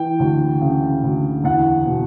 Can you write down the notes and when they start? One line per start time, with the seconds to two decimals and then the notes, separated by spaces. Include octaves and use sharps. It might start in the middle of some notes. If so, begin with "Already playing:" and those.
Already playing: E3 G5
0.19 D2
0.61 C#3
1.03 D2
1.44 E2 F#5
1.86 B2